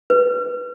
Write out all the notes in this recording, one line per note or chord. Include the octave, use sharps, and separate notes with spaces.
B4